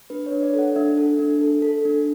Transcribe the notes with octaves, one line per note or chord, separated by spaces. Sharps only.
D4 B4
C#5
D4
D5
A4
F#5
D4 E5
A4
D4
A4
A4
D4